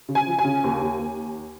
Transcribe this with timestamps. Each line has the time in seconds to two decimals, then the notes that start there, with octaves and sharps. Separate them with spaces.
0.09 C#3
0.15 G#5
0.27 F3
0.39 G#5
0.45 C#3
0.64 D#2
0.82 D#2
0.99 D#2